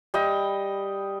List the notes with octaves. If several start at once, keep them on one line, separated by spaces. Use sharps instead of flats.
G3 D#5 G5